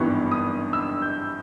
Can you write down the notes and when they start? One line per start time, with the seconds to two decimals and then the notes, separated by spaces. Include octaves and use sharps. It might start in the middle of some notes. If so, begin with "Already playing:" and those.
Already playing: G#1 G2 E3 G3 B3 C#6
0.31 D#6
0.73 E6
1.02 G6